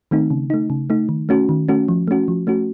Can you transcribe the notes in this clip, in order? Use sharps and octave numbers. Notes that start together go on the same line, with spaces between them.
D#3 A3 C4 D#4
C#3
A3 D#4
C#3
A3 D#4
D#3
A3 C#4 F#4
D#3
A3 C#4 F#4
F3
A3 C#4 F#4
F3
A3 C#4 F#4